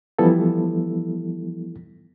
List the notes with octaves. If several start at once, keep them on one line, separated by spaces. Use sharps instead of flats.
E3 F3 G3 B3 E4 A4